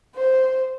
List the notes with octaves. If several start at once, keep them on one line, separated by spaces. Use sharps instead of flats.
C5